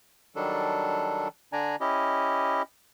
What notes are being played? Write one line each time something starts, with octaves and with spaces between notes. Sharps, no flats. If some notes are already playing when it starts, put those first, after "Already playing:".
D#3 F#3 G3 D4 A4
D3 D4 D5 G#5 A#5
C#4 E4 G4 D#5